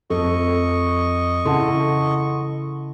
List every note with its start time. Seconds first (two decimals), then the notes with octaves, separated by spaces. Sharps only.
0.10 F2 A4 D#5 C#6
1.46 C#3 E4 A4 F#5 A5 C6